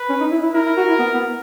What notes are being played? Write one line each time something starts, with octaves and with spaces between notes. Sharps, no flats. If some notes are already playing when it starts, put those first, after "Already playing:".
Already playing: B4
C#4
D#4
E4
E4
E4 A#4
E4
F#4
E4
B3
B3